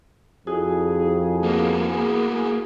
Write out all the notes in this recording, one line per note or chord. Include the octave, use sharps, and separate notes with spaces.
F2 E4 F#4 G#4
A#3 B3